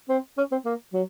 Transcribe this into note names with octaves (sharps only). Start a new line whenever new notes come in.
C4
C#4
C4
A#3
F#3